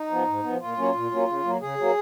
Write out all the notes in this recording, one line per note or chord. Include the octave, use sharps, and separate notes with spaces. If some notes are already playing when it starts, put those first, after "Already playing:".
Already playing: D#4
F3 B3
G#2
F3 B3
A#2 F4
F#3 A#3 C#4
A#2
F#3 A#3 C#4
C#3
F#3 A#3
C#3 G#4
F#3 A#3